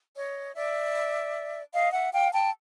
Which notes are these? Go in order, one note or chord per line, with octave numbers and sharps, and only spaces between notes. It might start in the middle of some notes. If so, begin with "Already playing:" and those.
C#5 D#5
D5 E5
D#5 F5
E5 F#5
F5 G5
G5 A5